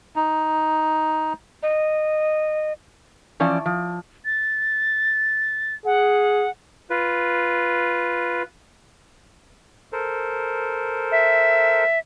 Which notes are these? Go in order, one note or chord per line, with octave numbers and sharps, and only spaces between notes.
D#4
D#5
E3 F3 C#4 D5 A5
F3
A6
G#4 F#5
F4 B4
A4 A#4 C5
E5